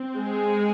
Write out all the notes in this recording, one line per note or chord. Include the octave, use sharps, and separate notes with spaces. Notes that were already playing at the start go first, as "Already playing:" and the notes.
Already playing: C4
G#3 G#4